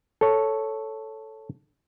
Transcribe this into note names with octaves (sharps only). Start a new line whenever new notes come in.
A4 C#5